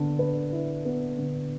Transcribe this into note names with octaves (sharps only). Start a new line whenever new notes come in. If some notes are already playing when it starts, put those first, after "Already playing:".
Already playing: D3 B3
B4
E4
B3
D3